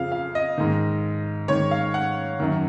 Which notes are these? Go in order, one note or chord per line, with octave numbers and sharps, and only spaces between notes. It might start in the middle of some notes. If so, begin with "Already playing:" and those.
Already playing: F2 C#3 F3 F5
F5
D#5
G#2 D#3
G#2 D#3 C#5
F5
F#5
F#2 D#3